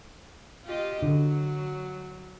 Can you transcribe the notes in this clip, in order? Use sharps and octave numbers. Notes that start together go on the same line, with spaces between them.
F4 G4 D#5
D3 F#3